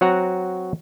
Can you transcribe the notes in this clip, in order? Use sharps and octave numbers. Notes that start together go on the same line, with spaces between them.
F#3 C4 F#4 F#5 A#5